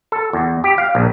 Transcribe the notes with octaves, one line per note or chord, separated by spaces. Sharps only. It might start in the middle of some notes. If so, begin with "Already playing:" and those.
A4
E2
G4
F5
A#1